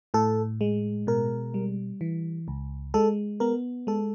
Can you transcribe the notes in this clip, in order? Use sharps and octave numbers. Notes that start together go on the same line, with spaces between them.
A2 A4
G#3
B2 A#4
G3
E3
C#2
G#3 A4
B3 A#4
G#3 A4